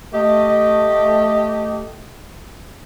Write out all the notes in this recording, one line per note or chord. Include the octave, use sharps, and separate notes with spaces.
A3 G4 D#5